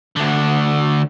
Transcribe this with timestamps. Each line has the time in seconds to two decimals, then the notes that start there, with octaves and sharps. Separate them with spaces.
0.16 D2 D3